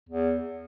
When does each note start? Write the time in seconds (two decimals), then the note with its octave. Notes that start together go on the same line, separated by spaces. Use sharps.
0.09 E2